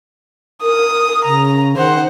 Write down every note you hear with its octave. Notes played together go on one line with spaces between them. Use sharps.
A#4 D#6
C#3 A#5
D#3 C5 F#5